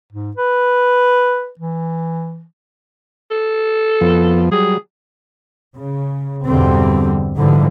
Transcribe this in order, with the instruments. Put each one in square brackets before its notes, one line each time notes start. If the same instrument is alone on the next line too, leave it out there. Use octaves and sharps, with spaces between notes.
[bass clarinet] G#2
B4
E3
[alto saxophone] A4
[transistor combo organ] F2 F3 B3
[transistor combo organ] F#3 G3 [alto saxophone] G#4
[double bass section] C#3
E2 G2 B2 D3 G3 C4
G#2 D3 E3 F3 G3